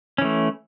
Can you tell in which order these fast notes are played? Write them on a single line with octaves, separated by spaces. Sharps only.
C#4 E3 A3